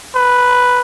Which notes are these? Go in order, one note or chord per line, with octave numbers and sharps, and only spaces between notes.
B4